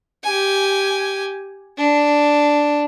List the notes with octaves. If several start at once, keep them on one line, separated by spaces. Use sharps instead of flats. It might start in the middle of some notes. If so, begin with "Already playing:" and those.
G4 G#5
D4